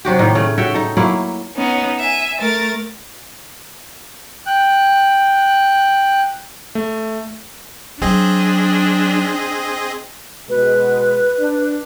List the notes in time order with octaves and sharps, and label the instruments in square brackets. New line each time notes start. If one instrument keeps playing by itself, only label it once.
[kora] C3 F#3 F#4 G4
A2 D#3 A#3 D#4
C#3 A3
F#4 C#5 E5 G5
D#4 A4
F#3 A3 A#3 E4
[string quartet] B3 C#4 D#4
E5 G#5
A3 A#4 A6
[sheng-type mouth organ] G5 F#6
[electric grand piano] A3
[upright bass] F#3 [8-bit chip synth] C4 G#4 D#5 [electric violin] D4
[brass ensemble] B2 G#3 [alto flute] B4
[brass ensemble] D4